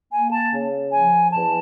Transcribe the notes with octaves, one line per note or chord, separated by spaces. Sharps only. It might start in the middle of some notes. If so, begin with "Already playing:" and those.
A#3 G#5
A5
C#3
F3 G#5
E2 A5